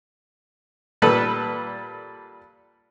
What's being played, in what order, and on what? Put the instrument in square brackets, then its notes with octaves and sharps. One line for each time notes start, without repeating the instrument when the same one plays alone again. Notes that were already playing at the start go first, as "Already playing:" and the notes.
[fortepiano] A#2 G3 A4 B4 A5 B5